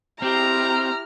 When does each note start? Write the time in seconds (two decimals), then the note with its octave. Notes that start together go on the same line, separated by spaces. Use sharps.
0.22 C4 E4 G4 A#5 F6